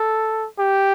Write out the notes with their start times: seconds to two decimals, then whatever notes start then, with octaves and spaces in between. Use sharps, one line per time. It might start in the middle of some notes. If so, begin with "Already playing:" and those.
Already playing: A4
0.59 G4